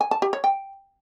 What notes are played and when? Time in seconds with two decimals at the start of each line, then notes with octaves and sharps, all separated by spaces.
0.01 G#5
0.11 A5
0.22 G4
0.33 C#5
0.44 G5